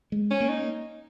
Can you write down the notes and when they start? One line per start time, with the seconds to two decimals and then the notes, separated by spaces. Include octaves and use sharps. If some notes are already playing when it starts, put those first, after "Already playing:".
0.12 G#3
0.30 C#4
0.40 A#3
0.49 D#4